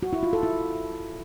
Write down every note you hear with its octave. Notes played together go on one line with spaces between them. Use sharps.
F#4
E4
F4
A4
E4